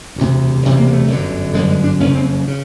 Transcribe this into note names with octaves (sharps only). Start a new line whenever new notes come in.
E1 D2 C3
E1 D2 C3
A#3
A#3
A3
G1 F#2 D3
G1 F#2 D3 G#3
G#3
D4
F#1 F2 C#3 C#4
C4
C#3